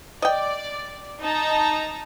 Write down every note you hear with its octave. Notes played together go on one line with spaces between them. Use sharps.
D5 D#5 G5
D#4 A5 A#5